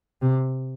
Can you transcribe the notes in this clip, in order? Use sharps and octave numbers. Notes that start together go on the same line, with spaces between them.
C3